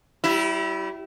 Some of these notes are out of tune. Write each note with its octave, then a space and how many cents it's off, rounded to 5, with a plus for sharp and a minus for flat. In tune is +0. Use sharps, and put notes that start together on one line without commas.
G3 -35 E4 +0